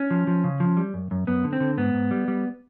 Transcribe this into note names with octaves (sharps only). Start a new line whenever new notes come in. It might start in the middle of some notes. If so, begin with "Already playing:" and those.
Already playing: C#4
F3
F3
C#3
F3
G3
F#2
F#2
F#2 B3
D3
C4
D3
G#2 B3
G#2
G3
G3